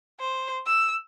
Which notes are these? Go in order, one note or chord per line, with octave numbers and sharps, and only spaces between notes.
C5
E6